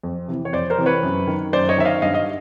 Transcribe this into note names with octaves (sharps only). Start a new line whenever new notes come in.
F2
C3 E3
C#5
F2 C5 D5
A#4 C5
C3 E3
B4 C#5
F#2
D#3
F#2 C5 D5
C#5 D#5
D#3 E5
D#5 F5
G2 D#5 F5
D#5 F5